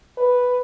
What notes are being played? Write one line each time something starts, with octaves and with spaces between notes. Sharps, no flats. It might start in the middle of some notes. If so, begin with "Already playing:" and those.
B4